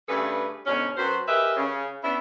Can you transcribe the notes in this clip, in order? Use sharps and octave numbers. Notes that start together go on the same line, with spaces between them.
G2 C#3 A3 G#4 A4 B4
G#2 B2 D3 C#4
F#2 F#4 B4 C5
G4 G#4 A#4 B4 D#5 E5
C#3
B3 C#4 D4 E4